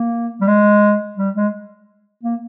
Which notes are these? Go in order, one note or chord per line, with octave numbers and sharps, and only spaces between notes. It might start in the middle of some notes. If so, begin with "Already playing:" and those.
Already playing: A#3
G3
G#3
G3
G#3
A#3